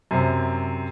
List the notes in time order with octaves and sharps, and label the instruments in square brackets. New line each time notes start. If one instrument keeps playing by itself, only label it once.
[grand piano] F#2 C3